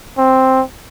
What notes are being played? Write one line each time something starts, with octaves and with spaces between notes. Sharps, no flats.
C4